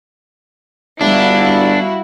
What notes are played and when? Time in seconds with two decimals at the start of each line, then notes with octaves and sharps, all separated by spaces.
1.01 G1 G3 D4 E4 F#4 F5